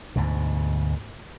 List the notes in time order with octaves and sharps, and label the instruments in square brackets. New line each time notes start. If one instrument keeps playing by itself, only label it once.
[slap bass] D2 G#2 B2